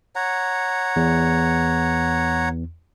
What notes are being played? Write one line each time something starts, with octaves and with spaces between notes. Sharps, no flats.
C#5 F#5 A#5
E2